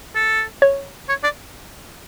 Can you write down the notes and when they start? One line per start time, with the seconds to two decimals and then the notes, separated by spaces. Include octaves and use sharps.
0.15 A4
0.62 C#5
1.09 C#5
1.24 D5